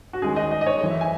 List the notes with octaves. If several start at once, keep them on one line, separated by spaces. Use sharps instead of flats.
F#4
D#3 G#3 C#4 G#4
D#5
D#5
D#5
C#5
F#2 E3 A3
E5
G#5